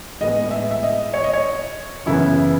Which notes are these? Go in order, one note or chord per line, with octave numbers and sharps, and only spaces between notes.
A2 G#3 B3 D#5
D#5
E5
E5
D#5
C#5
D#5
C#5
F#2 C#3 E3 B3 E4